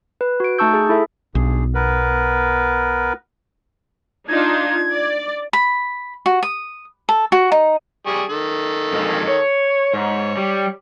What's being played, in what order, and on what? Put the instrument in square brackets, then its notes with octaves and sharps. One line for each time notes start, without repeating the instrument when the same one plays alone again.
[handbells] B4
F#4 D7
A3 D#4 A5 C#6 E6 G6
G#4
E4 A4 E5
[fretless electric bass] B1 [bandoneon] G2 G#4
[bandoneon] B3 A#4 B4
[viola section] D4 D#4 F4 [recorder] G#6
[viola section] D5
[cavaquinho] B5
F#4
D#6
A4
F#4
D#4
[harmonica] G3 G#4 C#6
D#3 A4
[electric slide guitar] F2 G#3
C#5
[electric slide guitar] G#2 [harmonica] C#5
[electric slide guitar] G3